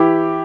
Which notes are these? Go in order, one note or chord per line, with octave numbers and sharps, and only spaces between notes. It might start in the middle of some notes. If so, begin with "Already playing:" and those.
Already playing: E3 E4 G4